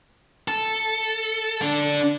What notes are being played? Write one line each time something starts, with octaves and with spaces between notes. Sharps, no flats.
A4
D4 A4